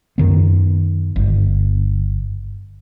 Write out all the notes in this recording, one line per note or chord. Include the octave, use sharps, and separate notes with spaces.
F#2 D#3 B3
G1